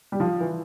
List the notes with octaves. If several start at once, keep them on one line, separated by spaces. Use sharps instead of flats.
G3
F3
E3